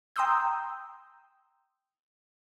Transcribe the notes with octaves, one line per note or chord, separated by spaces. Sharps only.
G5 A#5 C6 D#6 E6 G6